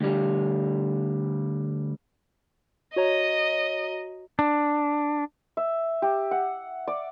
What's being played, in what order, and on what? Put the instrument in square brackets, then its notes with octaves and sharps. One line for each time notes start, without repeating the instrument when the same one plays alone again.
[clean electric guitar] D2 G3
[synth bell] F#4 C#5 A#5 [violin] D#5
[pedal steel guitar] D4
[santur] E5
G4
F#5
D5